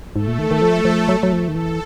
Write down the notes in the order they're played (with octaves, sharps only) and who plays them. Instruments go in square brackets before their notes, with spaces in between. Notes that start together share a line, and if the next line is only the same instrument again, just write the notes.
[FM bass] G#2 [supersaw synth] A3 A4
[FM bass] A#2
D#3
D#3
F3
F3
F#3
F#3
F3
D#3
[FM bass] E3 [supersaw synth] A4